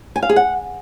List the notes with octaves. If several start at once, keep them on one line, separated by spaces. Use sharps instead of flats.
G#5
F5
G#4
F#5